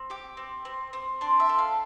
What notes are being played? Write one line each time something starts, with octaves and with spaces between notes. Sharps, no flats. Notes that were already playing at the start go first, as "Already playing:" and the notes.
Already playing: C4
G4 D6
C4
C4
C4
D4 C6
E5
A4
F5